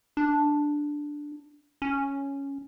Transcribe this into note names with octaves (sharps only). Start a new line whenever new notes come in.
D4
C#4